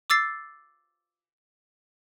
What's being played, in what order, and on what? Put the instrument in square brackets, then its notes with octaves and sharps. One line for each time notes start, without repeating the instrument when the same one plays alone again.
[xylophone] D6 E6 A6 C7